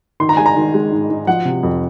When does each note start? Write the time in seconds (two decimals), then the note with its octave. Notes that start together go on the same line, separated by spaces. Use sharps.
0.20 D#3 C6
0.29 A#5
0.37 G#3 G#5
0.46 A#5
0.56 D#3
0.74 G#3
0.92 G#2
1.10 G#2
1.27 F3 F#5
1.45 C3
1.63 F2